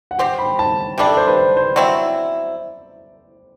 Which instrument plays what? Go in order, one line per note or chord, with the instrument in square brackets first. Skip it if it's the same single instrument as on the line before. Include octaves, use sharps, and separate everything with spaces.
[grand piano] F#5
[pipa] C4 G4 C5 [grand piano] G5
[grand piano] B5
A5
[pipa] C3 G3 D4 [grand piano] G5
[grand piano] A4
C5
B4
C5
C5
[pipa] F#3 C4 E4 [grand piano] D5